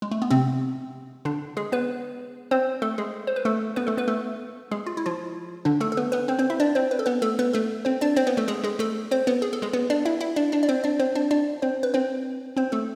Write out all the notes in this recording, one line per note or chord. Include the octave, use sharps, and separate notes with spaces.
G#3
A3
B3
C3 C4
D3 D4
G#3 G#4
B3 B4
C4 C5
A3 A4
G#3 G#4
C5
B4
A3 A4
B3 B4
A3 A4
B3 B4
A3 A4
G#3 G#4
F4
E4
F3 F4
D3 D4
A3 A4
A4
B3 B4
B3 B4
C4 C5
C4 C5
E4 E5
D4 D5
C4 C5
B4
A4
B3 B4
A3 A4
B3 B4
A3 A4
C4 C5
D4 D5
C4 C5
B3 B4
A3 A4
G#3 G#4
G#3 G#4
A3 A4
C4 C5
B3 B4
G#4
A4
G#3 G#4
B3 B4
D4 D5
E4 E5
E4 E5
D4 D5
D4 D5
D5
C4 C5
D4 D5
C4 C5
D4 D5
D4 D5
C4 C5
B4
C4 C5
C4 C5
A3 A4